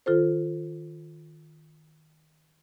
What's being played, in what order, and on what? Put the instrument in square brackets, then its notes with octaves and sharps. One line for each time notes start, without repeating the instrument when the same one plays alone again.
[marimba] D#3 F4 A4 C5